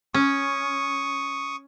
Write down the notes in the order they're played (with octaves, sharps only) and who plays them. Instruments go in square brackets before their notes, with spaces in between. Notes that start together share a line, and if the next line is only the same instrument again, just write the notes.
[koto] C#4 [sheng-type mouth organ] C#6 D#6